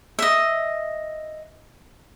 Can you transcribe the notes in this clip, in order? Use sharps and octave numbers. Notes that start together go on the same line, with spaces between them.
D#5 E5